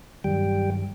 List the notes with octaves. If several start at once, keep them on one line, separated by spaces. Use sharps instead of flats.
G2 D#3 F#3 G3 G5